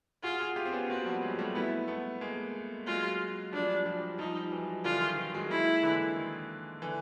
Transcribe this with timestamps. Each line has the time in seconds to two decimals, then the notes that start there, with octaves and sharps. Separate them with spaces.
0.23 F4 F#4 G#4
0.40 F#4 G#4
0.56 F4 G4
0.65 C4
0.72 B3 C#4
0.89 A#3 C4 F#4
1.06 F3 G3
1.22 F#3 G#3
1.39 G3 A3
1.55 A3 B3 E4
1.88 A3 B3
2.21 G#3 A#3
2.87 F#3 G#3 F4
3.52 F3 G3 D4
3.86 F3 G3
4.19 F3 G3 D#4
4.51 E3 F#3
4.84 D3 E3 F4
5.01 D#3
5.18 D#3
5.34 F#3 G#3
5.50 G#3 A#3 E4
5.83 D3 E3
6.16 D#3
6.82 D3 E3